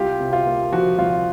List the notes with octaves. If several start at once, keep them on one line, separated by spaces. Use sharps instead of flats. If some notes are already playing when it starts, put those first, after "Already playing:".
Already playing: C2 F4 G4
C3
F4
A#3
F3 F#4
C2 F4